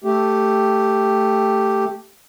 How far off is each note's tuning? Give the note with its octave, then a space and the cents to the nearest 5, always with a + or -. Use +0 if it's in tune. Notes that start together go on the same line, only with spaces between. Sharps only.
A3 +0 G4 +0